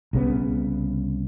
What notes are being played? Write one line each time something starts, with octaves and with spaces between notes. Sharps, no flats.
C2 C#3 B3